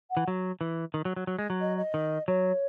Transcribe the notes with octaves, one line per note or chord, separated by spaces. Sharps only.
F#5
E3
F#3
E3
D#3
F#3
F#3
F#3
G#3
F#3
D#5
D#5
D#3
F#3 C#5